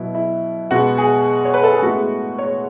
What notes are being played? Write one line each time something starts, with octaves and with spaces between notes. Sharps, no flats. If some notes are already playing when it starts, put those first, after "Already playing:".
Already playing: B2 F#3 B3 E4
E4
B2 G#3 B3 F#4
G#4
C#5
B4
A4
G#4
A2 G#3 B3 F#4
C#5